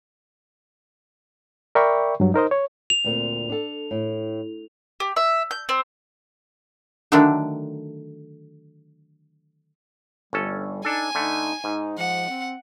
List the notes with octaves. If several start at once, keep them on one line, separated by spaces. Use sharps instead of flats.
A#4 D5 E5 G5 B5 C#6
G2 F#3
D#4 A#4 C5 D#5
C#5
F7
D2 A#2 C4
D4 A4
A2
G4
E5
G6
C4
D3 D#3 F#3 A3 D4
G1 G3 C#4 A4
D4 D#4 A4 G#5
D3 A3 D#4
G#2 D#4
F3 F#5
C4